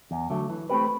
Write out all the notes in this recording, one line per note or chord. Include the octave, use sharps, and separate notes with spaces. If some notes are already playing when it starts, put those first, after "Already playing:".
E2
D3 F#3 A3
E3
A3 C4 G4 B4